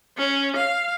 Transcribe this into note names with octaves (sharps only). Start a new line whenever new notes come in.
C#4
F5